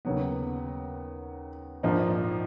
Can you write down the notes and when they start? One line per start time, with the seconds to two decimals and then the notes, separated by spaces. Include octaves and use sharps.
0.05 D#2 C#3 F#3 B3
1.83 A#1 G#2 F3 A#3 D#4